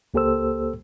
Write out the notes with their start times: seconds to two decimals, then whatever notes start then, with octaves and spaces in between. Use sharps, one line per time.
0.14 C#2 A#3 G4 A4 C5 E6